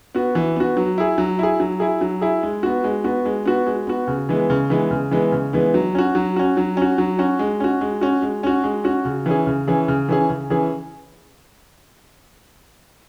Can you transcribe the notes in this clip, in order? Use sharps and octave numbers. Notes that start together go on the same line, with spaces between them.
B3 F#4
E3
B3 F#4
F#3
E4 G#4
F#3
E4 G#4
F#3
E4 G#4
F#3
E4 G#4
G#3
B3 F#4
G#3
B3 F#4
G#3
B3 F#4
G#3
B3 F#4
C#3
E3 G#3 B3
C#3
E3 G#3 B3
C#3
E3 G#3 B3
C#3
E3 G#3 B3
F#3
C#4 F#4
F#3
C#4 F#4
F#3
C#4 F#4
F#3
C#4 F#4
G#3
C#4 F#4
G#3
C#4 F#4
G#3
C#4 F#4
G#3
C#4 F#4
C#3
E3 C#4 G#4
C#3
E3 C#4 G#4
C#3
E3 C#4 G#4
C#3
E3 C#4 G#4